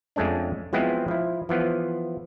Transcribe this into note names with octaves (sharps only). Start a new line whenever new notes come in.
F2 G#3 A3 C#4 D4
F3 F#3 G#3 B3 C4 E4
F3 E4
E3 F3 B3